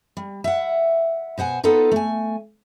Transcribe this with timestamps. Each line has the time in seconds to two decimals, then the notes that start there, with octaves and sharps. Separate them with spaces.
0.17 G3
0.44 E5 F#5
1.38 B2 C5 F#5 G#5
1.64 B3 D#4 F4 A4 B4
1.92 A3 G#5